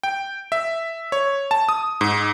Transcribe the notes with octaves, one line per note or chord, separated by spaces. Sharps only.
G5
E5
C#5
A5
D#6
G#2